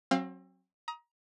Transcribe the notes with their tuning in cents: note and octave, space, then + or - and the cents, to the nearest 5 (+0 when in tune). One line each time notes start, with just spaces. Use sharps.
F#3 +0 C4 +35 F5 +0
A#5 +25 D#6 +25